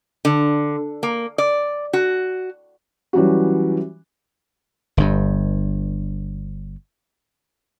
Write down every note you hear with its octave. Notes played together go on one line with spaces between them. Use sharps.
D3
A#3
D5
F#4
E3 F#3 G3 C#4 F#4
G1 G2